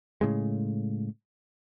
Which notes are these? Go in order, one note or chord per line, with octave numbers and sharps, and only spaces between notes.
A2 C#3 G#3